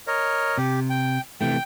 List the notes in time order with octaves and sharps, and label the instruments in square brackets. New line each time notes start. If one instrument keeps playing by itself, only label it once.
[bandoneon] A#4 C#5 D#5
[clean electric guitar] C3 [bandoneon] G4
[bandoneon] G5
[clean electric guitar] C3 E3 A3 [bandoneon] G5